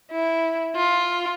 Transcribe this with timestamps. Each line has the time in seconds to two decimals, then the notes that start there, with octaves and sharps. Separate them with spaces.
0.11 E4
0.76 F4